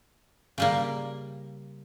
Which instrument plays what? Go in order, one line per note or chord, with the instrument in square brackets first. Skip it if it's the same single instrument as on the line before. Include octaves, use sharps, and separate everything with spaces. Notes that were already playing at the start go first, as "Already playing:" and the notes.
[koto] C#3 G3 A#3